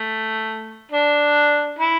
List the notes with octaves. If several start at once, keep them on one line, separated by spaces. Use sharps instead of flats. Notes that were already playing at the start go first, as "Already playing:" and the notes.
Already playing: A3
D4
E4